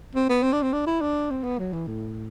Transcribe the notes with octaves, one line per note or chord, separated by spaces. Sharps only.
C4
B3
C4
D4
C4
D4
E4
D4
C4
B3
F#3
E3
A2